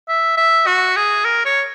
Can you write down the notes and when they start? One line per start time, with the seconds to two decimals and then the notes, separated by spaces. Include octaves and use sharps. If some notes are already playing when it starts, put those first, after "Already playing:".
0.09 E5
0.37 E5
0.67 F#4
0.96 G#4
1.25 A#4
1.46 C#5